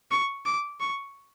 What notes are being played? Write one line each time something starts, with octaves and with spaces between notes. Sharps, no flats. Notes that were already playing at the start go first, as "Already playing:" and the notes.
C#6
D6
C#6